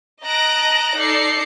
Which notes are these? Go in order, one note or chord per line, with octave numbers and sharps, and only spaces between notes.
D#5 A5 A#5 F#6 A#6 D7
D#4 A4 D5 C7 C#7